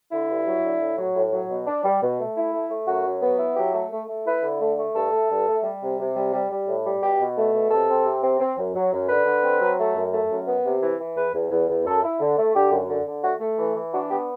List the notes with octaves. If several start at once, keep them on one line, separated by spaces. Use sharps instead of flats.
D3 E4
G2
F#3
D3
A2
F#3
A2
F#3
B2
D4
G3
B2
A3
E4
A3
A3
F#2 F#4
F#3
B3
E4
F#3 G4
A3
A3
A3
E4 B4
D3
A3
A3
G2 A4
A3
G2
A3
G3
C3
C3
G3
G3
G3
A2
G3
B2 G4
B2
A3
B2
C3 A4
C4
C3
C4
C4
F#2
F#3
F#2
D3 B4
D3
C4
F#3
A3
F#2
A3
F#2
B3
C3
E3
E3
E2 B4
E2
E2
E2
F#2 A4
E4
D3
A3
D3 G4
F#2
D3
D3
A3 F#4
A3
E3
E3
D4 F#4
B3 G4